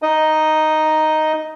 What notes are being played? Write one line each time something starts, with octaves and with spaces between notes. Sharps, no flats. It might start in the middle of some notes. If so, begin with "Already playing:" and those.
D#4 D#5